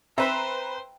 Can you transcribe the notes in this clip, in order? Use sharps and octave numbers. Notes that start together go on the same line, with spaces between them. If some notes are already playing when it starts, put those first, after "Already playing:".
C4 B4 C5 E5 A#5